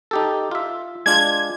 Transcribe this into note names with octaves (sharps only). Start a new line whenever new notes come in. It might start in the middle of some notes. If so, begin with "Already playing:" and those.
D#4 G4 A4
F4 E5
G#3 D4 F4 G#6